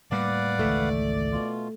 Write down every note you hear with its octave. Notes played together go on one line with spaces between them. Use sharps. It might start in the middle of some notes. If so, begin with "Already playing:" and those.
A2 G3 A#3 B4 D5 F5 F#5
G#1 C#2 E3 A3
B2 F4